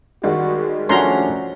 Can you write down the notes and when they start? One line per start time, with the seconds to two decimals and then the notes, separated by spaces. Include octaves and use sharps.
0.24 D#3 G3 G#3 F#4
0.89 F3 A3 C#4 D4 F#4 A#5 C6